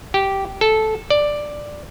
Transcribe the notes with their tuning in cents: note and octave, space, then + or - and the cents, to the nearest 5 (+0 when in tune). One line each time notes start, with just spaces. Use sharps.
G4 -10
A4 -10
D5 +5